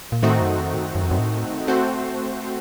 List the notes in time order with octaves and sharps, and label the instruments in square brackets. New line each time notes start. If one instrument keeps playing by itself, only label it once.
[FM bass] A#2
[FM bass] A2 [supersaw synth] D#3 A3 C4 D#4 F#4
[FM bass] F#2
F2
A2
F#2
F#2
F2
F#2
A2
[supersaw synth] A3 C4 F#4 C5